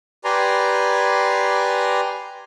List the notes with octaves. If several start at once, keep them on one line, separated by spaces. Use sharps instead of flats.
G4 B4 D5 G#5 A#5 C6